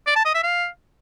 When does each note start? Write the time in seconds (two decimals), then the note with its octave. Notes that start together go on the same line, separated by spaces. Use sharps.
0.07 D5
0.16 A5
0.25 D#5
0.34 E5
0.43 F5